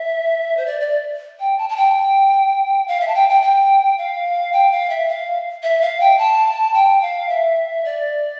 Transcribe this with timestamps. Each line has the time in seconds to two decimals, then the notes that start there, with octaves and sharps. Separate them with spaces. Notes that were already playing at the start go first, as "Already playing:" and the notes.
Already playing: E5
0.57 C5
0.66 D5
0.80 D5
1.40 G5
1.58 A5
1.69 A5
1.76 G5
2.88 F5
3.01 E5
3.08 A5
3.15 G5
3.29 G5
3.42 G5
3.98 F5
4.53 G5
4.71 F5
4.89 E5
5.08 F5
5.63 E5
5.81 F5
6.00 G5
6.18 A5
6.74 G5
7.01 F5
7.29 E5
7.85 D5